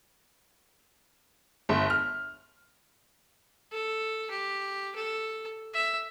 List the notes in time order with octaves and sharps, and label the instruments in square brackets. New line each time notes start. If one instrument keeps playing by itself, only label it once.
[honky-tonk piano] G1
F6
[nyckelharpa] A4
G4
A4
E5